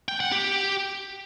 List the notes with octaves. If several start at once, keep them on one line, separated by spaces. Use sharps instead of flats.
G5
F#5
G4